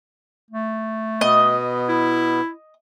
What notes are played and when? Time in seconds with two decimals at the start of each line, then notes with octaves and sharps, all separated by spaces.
0.51 A3
1.21 B2 B3 D#5
1.89 E4